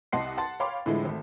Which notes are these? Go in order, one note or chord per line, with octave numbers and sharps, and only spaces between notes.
C2 D#5 F#5 A5 C6 C7
F#5 A5 C6 A6
C#5 F5 G5 B5 C6 D6
A2 D3 E3 F3 G#3 E4
G#1 A3